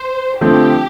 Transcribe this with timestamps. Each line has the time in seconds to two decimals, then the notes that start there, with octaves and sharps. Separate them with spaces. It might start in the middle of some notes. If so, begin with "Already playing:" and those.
Already playing: C5
0.41 D3 F3 A3 C4 G4